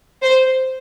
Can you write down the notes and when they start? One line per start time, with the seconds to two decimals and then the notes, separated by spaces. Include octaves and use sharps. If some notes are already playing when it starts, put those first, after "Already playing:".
0.22 C5